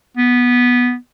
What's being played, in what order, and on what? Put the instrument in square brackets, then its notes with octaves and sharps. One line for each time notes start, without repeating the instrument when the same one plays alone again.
[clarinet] B3